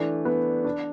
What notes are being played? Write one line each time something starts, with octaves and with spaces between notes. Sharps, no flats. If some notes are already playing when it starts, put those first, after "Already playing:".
Already playing: E3 A3 D4
B3
D4